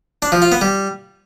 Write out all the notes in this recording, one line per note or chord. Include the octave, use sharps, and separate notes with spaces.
D4
F3
F4
B3
G3